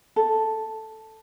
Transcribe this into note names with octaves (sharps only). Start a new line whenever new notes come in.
A4